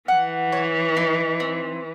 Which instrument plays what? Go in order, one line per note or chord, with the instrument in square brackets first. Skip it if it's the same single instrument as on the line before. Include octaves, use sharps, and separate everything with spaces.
[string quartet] E3 [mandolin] F#5
[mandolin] C#5
D#4
C4